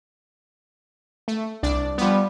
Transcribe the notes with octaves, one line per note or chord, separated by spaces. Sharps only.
A3
C2 D4 D5
F3 G3 B3